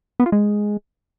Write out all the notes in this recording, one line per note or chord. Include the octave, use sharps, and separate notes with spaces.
B3
F4
G#3